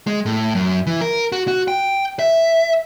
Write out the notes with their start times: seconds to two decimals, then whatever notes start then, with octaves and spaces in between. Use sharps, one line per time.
0.07 G#3
0.26 A2
0.55 F#2
0.87 E3
1.01 A#4
1.32 F#4
1.48 F#4
1.68 G5
2.19 E5